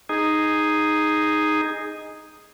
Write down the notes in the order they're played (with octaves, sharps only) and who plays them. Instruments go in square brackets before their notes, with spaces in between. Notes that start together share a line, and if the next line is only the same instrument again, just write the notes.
[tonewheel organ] D#4 G#4